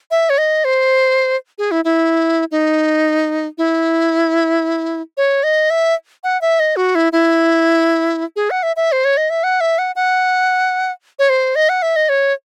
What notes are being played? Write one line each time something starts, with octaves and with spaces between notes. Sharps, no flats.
E5
C#5
D#5
C5
G#4
E4
E4
D#4
E4
C#5
D#5
E5
F#5
E5
D#5
F#4
E4
E4
G#4
F#5
E5
E5
C5
C#5
D#5
E5
F#5
E5
F#5
F#5
C#5
C5
D#5
F#5
E5
D#5
C#5